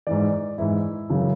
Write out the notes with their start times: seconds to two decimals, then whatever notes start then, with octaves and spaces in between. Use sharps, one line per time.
0.07 G#2 E3 D5
0.58 G#2 E3 E4
1.10 F#2 C#3 E3